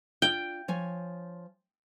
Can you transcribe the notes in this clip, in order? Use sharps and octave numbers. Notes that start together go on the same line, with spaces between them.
D4 F4 G5
F3 C#5 G#5